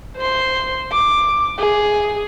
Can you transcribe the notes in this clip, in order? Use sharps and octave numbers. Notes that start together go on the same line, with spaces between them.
C5 C6
D6
G#4